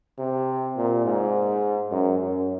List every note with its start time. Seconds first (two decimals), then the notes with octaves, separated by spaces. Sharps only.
0.18 C3
0.76 A#2
1.05 G#2
1.91 F#2
2.20 F#2